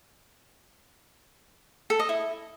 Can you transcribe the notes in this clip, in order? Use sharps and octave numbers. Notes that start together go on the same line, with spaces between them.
A4
D#5
E4